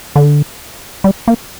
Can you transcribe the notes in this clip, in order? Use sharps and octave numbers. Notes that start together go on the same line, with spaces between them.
D3
G3
A#3